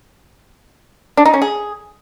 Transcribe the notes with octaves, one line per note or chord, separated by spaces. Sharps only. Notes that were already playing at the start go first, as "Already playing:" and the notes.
D4
D#4
C#4
G#4